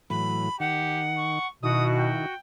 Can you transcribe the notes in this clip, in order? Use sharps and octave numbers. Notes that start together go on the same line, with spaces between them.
A2 E3 F#3 B5
D#3 G4 F#5
C#6
B2 D#3 E4 F#4 D#6
G5